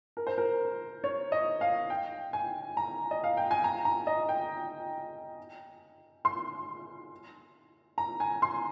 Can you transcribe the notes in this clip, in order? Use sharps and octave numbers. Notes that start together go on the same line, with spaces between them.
A#4
C5
A#4
C#5
D#5
F5
G5
G#5
A#5
D#5
F5
G5
G#5
A#5
A#5
D#5
G5
C6
A#5
G#5
C6